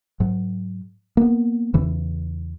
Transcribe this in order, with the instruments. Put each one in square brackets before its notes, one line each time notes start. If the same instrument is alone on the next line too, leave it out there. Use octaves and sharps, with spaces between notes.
[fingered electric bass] G#2 F#3
A#3 B3
E2 C#3 E3